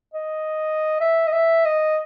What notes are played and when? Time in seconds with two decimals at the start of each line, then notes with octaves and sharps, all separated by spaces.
0.14 D#5
1.00 E5
1.27 D#5
1.33 E5
1.65 D#5